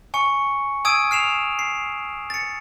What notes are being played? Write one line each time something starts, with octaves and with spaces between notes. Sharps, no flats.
G#5 C#6 C#7
G#5 D#6 E6 G#6 D7 D#7
F6 C7 E7 F7
C7
A6 C#7